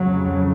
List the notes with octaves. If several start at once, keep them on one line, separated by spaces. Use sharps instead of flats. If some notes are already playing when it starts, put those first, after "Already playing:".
Already playing: F2 C#3 F#3